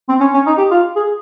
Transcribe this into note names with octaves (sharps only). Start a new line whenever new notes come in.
C4
C#4
C#4
D#4
G4
F4
G#4